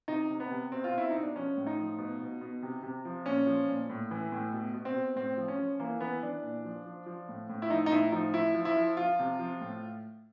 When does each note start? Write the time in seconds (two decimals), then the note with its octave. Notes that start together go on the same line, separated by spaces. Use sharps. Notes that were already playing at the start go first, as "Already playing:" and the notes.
0.08 C3 D#4
0.30 C3
0.40 B3
0.51 C3
0.72 B2 C4
0.84 F4
0.93 B2 E4
1.10 B2 D#4
1.23 D4
1.36 F3 C#4
1.57 A2
1.67 D#4
1.78 F3
1.98 B2
2.20 B2
2.41 B2
2.62 C3
2.83 C3
3.05 F3
3.26 A#2 C#4
3.47 F3
3.68 A#2
3.90 A2
4.11 E3
4.32 A2
4.53 B2
4.74 B2
4.85 C4
4.96 B2
5.16 A2 C4
5.37 F3
5.48 C#4
5.59 F3
5.80 E3 A#3
6.00 E3 B3
6.23 E3 D4
6.43 A#2
6.65 F3
6.85 F3
7.06 F3
7.29 A2
7.49 A2
7.62 E4
7.70 F3 D#4
7.86 D#4
7.92 A2 E4
8.12 F3 D#4
8.34 F3 E4
8.55 F3
8.65 E4
8.77 F3
8.97 F3 F4
9.19 C3
9.39 F3
9.61 A2